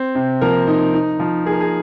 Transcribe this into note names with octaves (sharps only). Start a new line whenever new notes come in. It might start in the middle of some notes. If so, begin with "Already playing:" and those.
Already playing: C4
C3
F3 A#3 A#4
D#4
D#4
F3
A#3 G#4
A#4
G#4